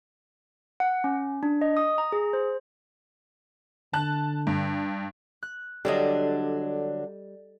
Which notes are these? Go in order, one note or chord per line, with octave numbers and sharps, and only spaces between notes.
F#5
C#4
D4
D#5
D#6
A#5
G#4
C5
D3 A5 F#6
G2
F#6
D3 F#3 G3 D4 A4 D#5